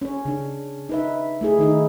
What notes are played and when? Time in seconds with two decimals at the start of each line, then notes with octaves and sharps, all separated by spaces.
0.02 C#4 C#5
0.25 C#3 D4
0.89 D#4 B4 E5
1.41 A3 E4 G#4
1.59 D#3 D#4 E4